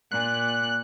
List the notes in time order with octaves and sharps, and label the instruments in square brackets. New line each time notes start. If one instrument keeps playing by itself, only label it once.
[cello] A#2 [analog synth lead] F#6